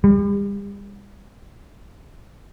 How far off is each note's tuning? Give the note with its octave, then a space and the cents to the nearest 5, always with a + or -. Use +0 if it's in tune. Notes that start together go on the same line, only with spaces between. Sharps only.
G3 +40